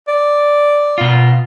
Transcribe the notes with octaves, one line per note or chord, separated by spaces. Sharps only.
D5
B2 F4